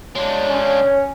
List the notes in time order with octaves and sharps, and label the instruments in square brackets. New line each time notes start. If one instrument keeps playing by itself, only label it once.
[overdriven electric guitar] G#3 D4 [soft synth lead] C#5
[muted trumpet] C#4